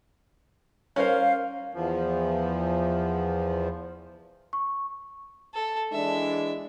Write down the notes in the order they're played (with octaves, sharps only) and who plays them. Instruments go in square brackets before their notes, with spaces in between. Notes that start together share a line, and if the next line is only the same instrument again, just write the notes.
[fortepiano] C#4 A#4 C5 [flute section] F5
[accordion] E2 F3
[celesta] C#6
[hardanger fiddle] A4
[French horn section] E3 G#3 D4 [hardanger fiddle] E5